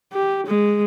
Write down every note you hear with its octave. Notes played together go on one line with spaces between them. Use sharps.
G4
G#3